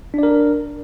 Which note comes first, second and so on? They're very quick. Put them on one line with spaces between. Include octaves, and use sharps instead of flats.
D4 D5 A#4